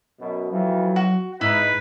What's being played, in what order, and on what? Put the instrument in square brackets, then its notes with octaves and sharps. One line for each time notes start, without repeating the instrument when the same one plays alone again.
[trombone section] F#2 B2
[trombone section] F2 E3 [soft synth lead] F#3
[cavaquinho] F#4
[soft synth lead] G#2 [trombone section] D#4 [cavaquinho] E4 [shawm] B4